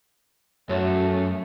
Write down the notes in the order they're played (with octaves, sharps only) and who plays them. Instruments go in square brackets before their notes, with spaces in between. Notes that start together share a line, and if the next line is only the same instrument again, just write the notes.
[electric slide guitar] F#2 [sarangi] A3 [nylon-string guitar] F#4 A4 C#5